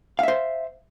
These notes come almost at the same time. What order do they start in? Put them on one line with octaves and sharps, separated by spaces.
F5 E5 C5